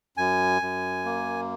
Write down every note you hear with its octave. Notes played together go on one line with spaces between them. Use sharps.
F#2 G#5
F#2
A#3